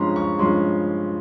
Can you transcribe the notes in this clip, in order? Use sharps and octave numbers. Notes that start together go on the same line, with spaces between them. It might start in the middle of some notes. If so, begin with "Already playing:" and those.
Already playing: G2 F3 G#3 C#4 A#5 C6
C#6
G2 F3 G#3 C#4 C6